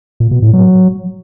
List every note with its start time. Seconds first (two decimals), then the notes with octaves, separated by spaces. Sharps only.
0.20 A#2
0.31 B2
0.42 A2
0.53 F#3